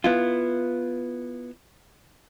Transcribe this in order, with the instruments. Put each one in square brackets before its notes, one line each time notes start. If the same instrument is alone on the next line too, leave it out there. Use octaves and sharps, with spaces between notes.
[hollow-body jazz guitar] B3 E4 F4